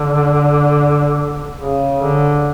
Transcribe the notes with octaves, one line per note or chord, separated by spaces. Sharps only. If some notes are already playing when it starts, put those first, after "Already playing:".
Already playing: D3
C#3
D3